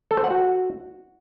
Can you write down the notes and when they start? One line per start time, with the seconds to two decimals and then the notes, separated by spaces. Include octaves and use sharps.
0.11 A4
0.17 C5
0.24 F#5
0.31 F#4